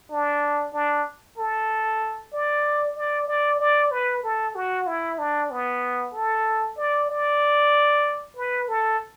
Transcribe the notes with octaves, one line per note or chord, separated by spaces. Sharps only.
D4
D4
A4
D5
D5
D5
D5
B4
A4
F#4
E4
D4
B3
A4
D5
D5
B4
A4